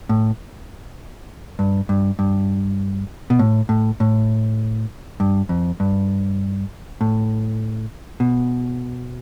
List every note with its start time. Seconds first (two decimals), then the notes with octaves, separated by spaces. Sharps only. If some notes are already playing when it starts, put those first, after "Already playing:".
0.09 A2
1.59 G2
1.89 G2
2.19 G2
3.30 B2
3.39 A2
3.69 A2
4.00 A2
5.20 G2
5.49 F2
5.80 G2
7.01 A2
8.20 B2